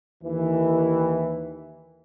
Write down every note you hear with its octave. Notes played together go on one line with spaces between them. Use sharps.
D#2 E3